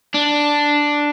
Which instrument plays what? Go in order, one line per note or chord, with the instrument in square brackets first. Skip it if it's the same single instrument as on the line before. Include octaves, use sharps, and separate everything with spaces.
[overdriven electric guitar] D4